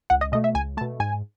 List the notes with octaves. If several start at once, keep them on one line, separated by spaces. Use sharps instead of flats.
C#2 F#5
D#5
B2 A3 D#5
E5
C#2 G#5
B2 A3 A5
G#2 G#5